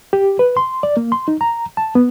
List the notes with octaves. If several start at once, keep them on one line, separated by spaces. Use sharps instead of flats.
G4
B4
C6
D5
A#3
C6
D#4
A#5
A5
B3